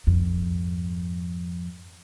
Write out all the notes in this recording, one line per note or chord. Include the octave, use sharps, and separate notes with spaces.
F2 G#2